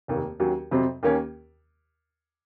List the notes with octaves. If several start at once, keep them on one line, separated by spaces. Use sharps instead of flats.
F1 D#2 D#3 A#3
D#2 D#3 F#3 C#4 F#4
F2 C3 F#3 C4
D#2 D#3 A#3 C#4